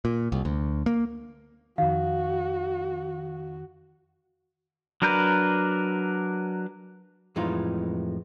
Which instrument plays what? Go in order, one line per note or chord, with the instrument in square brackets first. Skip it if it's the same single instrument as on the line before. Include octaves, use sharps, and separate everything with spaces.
[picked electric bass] A#2
C2
D2
A#3
[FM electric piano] F2 D#3 [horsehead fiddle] F#4 [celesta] F5
[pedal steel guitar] F#3 D4 A#4 B4 G6
[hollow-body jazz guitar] F2 A2 E3 G#3 D#4 F4